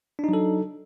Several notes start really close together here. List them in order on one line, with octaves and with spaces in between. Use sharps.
D4 D#4 F#3 A4